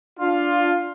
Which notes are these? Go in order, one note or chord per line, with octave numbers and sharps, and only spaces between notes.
D4 F4